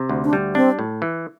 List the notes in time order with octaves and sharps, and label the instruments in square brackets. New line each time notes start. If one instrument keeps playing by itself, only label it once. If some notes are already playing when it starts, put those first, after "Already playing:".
Already playing: [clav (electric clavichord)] C3
D2
[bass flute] D4
[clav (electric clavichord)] G3
[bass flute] C4 [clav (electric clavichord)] D4
[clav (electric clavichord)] A2
E3